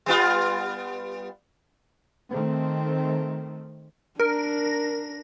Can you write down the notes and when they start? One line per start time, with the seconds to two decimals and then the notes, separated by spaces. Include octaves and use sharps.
0.06 G3 B3 F4
2.31 D#3 A3 C4
4.20 D4 A#4